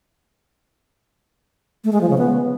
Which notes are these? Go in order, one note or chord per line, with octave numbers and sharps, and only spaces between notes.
A3
G#3
F3
C#3
B3